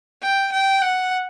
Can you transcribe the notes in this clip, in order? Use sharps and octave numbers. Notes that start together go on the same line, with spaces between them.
G5
G5
F#5